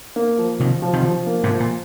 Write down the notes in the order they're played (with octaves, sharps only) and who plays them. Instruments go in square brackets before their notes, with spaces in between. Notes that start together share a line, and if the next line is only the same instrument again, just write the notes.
[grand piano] A#3
F3
[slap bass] C3 D#3 [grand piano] F3
[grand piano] F3
[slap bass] C3 D#3
[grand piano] F3
A#3
[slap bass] G#2 C3
[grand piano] F3
[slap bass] A#2